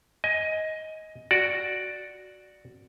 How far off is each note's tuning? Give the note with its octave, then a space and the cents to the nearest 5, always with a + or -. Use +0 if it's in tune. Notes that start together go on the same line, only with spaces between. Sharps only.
D#5 +15 G#5 +0
F#4 +0 D5 +0